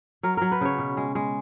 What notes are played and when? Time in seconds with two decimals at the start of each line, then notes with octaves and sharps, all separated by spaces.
0.23 F#3 A#4
0.37 F#3 A#4
0.52 B4
0.61 C#3 C#5
0.78 B2
0.97 G#3
1.15 G#3